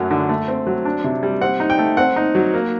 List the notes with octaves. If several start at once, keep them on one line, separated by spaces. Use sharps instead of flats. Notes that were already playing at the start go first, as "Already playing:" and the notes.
Already playing: F#2 F#3 A3
D3
A3
C4
F#3
D4
C3
G3
C4 F#5
D#4
G5
A3
C4 F#5
D#4
F#3
A#3